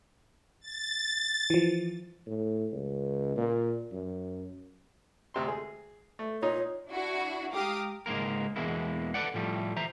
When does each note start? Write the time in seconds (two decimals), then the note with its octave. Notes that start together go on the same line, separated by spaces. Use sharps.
0.60 A6
1.50 E3 F3
2.27 A2
2.72 C#2
3.37 A#2
3.92 F#2
5.34 D2 C3 C6
5.48 G#4
6.19 A3
6.42 A#2 D#4 C#5
6.89 D4 E4 F#4
7.53 G#3 G4 F5 A#5 D6 D#6
8.06 C#2 G#2 G#3 A#3 A#4
8.56 E2 B2 E3 G#3 A#3 E4
9.14 A4 B4 C5 D5 F#5
9.34 A2 F3 G3 A3
9.76 E3 C5 E5 A#5